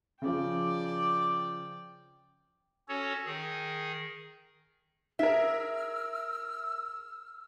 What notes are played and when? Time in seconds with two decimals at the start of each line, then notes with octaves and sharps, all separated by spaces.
0.22 C#3 F3 D5 G5
2.88 C#4 F#4 A4 C#5
3.26 D#3 G#4
5.19 E4 G#4 A#4 E5 E6 F6